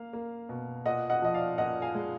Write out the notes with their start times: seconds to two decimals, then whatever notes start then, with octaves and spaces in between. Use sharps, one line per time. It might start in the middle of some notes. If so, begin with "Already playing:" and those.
Already playing: A#3 F5
0.13 A#3
0.49 B2
0.85 A#2 D#5 F#5
1.10 D#5 F#5
1.22 F3 D#5
1.34 D5 F5
1.58 A#2 D#5 F#5
1.82 F5 G#5
1.95 G#3